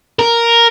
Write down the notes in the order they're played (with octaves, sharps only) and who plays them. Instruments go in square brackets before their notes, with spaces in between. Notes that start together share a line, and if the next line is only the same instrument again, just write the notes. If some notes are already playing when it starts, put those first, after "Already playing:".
[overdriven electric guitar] A#4